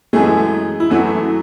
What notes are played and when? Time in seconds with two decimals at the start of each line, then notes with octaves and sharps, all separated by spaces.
0.13 F#2 E3 G#3 A3 G#4
0.80 E4
0.90 F#2 E3 F#3 A3 F#4